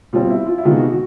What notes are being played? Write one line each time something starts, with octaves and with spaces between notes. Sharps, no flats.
B2 G3 C4 F4
E4
F4
E4
C3 D#3 G#3 B3 F4
F#4
F#4